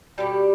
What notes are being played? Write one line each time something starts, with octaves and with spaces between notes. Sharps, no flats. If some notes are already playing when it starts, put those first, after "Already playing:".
B2 G3 G4 A4